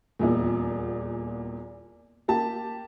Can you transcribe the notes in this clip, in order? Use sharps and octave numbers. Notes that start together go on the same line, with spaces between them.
D#1 E2 A#2
A#3 G4 A5